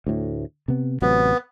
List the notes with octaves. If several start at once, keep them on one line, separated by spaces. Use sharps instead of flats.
D2 A2
C3 B3
A1 C3 F#3 B3